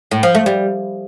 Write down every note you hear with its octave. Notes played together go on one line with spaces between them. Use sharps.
A2
F3
A3
G3